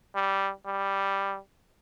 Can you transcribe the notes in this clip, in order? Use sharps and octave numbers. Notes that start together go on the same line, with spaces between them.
G3
G3